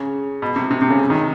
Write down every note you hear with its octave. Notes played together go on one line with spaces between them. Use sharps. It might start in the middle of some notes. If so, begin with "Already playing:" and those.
Already playing: C#3
B2
C3
C3
C3
C#3
D#3